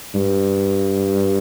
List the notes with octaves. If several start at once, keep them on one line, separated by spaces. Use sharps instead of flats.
G2